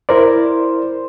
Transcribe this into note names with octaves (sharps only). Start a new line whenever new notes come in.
E4 A#4 C5 D5